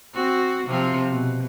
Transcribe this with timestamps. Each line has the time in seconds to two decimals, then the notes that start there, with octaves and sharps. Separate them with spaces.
0.14 C4 F#4
0.67 C3 F3 C4
1.10 B2